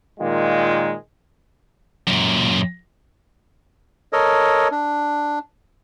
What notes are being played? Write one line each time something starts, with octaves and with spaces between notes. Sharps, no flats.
A#2 D#3 G#3 F4
F#2 A#2
A4 A#4 C#5 D#5
D4